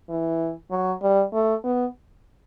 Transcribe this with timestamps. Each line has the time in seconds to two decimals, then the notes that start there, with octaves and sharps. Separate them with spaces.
0.09 E3
0.71 F#3
1.02 G3
1.33 A3
1.64 B3